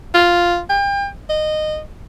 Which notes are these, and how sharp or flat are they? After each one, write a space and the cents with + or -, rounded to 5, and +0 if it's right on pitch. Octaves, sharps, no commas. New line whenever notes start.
F4 +0
G5 +35
D#5 -15